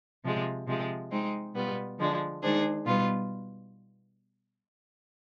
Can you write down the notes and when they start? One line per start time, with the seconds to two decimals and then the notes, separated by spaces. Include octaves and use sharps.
0.24 C3 F3 G#3
0.67 C3 F3 G#3
1.11 G#3 C4 D#4
1.55 B2 G3 B3 F4
1.99 D3 F3 G#3 D4
2.42 D#3 G#3 D4 G#4 C5
2.86 B2 G3 B3 F4 B4